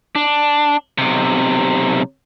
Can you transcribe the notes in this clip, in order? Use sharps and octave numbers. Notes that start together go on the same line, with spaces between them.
D4
B1 C3